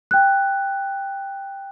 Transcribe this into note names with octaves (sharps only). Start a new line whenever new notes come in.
G5 F#6